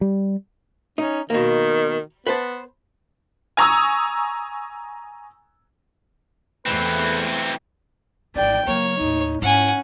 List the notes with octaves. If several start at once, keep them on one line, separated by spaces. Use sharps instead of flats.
G3
C#4 D#4
B2 D#3 A#3
B3 B4 C5 A5
G#5 A#5 C#6 D#6 E6
E2 E3 A3 C4 B4
G#1 C4 D5 G5
C#3 F#3 A#3 C#5
D#2 A2 D#4
G#2 C#4 E4 F#5 G#5